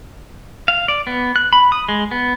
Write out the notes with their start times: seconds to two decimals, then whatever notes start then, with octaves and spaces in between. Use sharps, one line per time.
0.68 F5
0.88 D5
1.07 B3
1.36 F#6
1.53 B5
1.72 D#6
1.89 G#3
2.11 B3